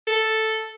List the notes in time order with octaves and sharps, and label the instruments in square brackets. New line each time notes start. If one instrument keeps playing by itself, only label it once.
[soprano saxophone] A4